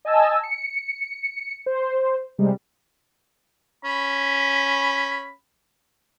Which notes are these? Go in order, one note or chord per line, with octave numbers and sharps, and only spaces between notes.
D#5 G#5 A5 E6
C#7
C5
C3 G3 G#3
C#4 B5